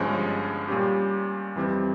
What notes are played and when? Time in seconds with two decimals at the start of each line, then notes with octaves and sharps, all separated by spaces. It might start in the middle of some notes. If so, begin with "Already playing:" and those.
Already playing: G1 G2 F3 G#3 C#4
0.68 A#2 G3 C#4 G4
1.55 F2 E3 G3 C4